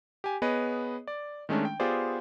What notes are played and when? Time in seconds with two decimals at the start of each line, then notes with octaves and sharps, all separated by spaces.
0.24 G4 G#5
0.42 B3 G#4 B4 C#5 D#5
1.07 D5
1.49 D#3 G#3 A3 C#4 D4
1.65 G5
1.80 B3 F4 G4 G#4 C5 D5